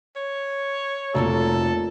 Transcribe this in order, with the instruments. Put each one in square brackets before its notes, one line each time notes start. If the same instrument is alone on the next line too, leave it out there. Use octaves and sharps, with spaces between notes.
[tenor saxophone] C#5
[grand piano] F1 D5 A#5 [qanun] F#3 A#3 F4 [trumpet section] A4